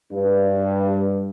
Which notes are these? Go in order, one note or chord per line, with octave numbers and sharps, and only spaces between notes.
G2